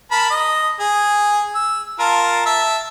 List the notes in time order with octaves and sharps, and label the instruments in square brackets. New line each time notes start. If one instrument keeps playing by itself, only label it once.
[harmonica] A#4 A5 B5
D#5
G#4
E6
F4 A#4 A5
E5 A5